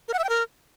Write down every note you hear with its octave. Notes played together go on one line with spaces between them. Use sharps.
A#4
F#5
E5
G5
A#4